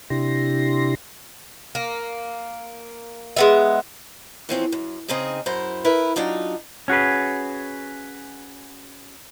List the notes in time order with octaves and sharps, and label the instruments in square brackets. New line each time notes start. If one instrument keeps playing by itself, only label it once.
[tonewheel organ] C3 D4 E4 G4 C6 A#6
[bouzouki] A#3
G#3 B3 E5
[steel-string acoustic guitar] E3 F3 C4 C#4
F#2
C#3 C4 D#4 G#4 D#5
F#2 E4 C5 A#5
E4 A#4 B4
F#3 D4 D#4 F4
[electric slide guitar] C#4 F#4 G#4 B4